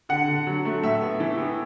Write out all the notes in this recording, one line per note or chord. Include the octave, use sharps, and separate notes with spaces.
D3 F#5
D3
F#3
A3
A2 E5
B3
E3
B3